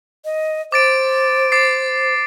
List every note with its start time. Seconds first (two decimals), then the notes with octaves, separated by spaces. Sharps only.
0.25 D#5
0.72 C5 D6 A6 D7
1.52 D6 A6 C7